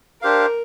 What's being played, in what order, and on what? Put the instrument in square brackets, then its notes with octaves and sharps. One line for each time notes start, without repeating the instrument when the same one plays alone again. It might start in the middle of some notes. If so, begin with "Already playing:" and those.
[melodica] D4 G4 C5 F5 [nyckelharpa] A#4